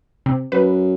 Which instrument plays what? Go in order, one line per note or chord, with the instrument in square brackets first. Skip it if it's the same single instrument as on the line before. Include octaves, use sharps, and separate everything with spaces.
[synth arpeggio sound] C3
[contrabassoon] F#2 [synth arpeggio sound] B4